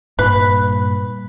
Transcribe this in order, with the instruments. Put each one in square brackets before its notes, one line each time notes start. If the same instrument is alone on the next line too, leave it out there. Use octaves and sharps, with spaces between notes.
[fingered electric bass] G2 A#2 [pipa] B4